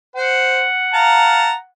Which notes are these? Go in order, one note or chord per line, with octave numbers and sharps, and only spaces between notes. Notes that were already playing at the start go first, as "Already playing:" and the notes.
C5 F#5
F5 A5 A#5